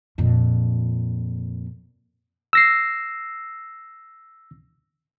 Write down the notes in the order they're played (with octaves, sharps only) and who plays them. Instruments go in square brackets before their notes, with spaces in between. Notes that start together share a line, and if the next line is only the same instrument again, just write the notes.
[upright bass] F2 A#2
[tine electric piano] E6 A#6 C7